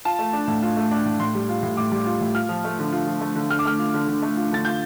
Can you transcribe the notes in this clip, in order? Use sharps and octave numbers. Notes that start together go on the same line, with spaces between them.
F4 A5
A3
D4
A2
F4
A3
D4
A2
A2 C6
G3
F4
A2
A2 D6
G3
F4
A2
F4 F6
F3
A3
D3
F4
F3
A3
D3
D3 F6
D6
A3 F6
F4
D3
D3
A3
F4
D3 A6
F4 G6